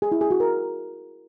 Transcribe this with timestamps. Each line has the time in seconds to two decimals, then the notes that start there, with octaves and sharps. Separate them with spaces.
0.02 G#4
0.12 E4
0.21 G#4
0.31 F#4
0.40 A#4